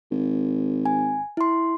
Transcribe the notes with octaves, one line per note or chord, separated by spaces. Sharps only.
G#1
G#5
E4 C6